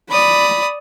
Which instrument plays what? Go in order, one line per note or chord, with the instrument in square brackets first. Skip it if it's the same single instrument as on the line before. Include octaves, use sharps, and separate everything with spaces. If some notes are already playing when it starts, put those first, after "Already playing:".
[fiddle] D5 D#6 [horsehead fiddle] B5